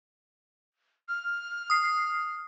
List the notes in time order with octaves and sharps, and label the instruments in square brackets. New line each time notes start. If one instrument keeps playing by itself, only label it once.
[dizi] F6
[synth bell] D#6 C7